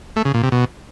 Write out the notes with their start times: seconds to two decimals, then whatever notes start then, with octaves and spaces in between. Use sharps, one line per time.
0.16 A3
0.25 C#3
0.34 A#2
0.43 C3
0.52 B2